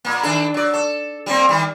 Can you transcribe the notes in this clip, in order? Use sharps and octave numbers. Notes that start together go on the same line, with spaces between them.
A#2 A#3
D#3 D4 A4
F#3 D5
A4
G3 A#3 C4
D#3 G3